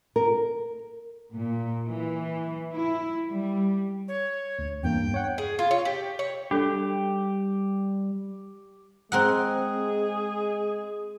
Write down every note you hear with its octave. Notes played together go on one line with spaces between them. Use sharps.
A#4
A#2
E3
E4
G3
C#5
D2
E2 G2 A#3 G5
C#5 F#5
G#4
F4
C#5
G4
C#5
G3 D4 G4 A4
G#3 C4 G#4 A#4 F#5